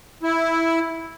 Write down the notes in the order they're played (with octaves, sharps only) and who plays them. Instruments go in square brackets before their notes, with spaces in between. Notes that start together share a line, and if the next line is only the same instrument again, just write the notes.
[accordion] E4